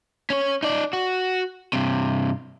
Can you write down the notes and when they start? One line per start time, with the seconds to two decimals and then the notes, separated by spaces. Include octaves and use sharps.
0.30 C#4 C#5
0.63 D#4 D5
0.93 F#4
1.73 G2 C3